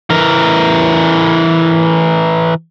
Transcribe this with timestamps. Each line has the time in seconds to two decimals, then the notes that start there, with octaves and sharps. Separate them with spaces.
0.10 E3 A#4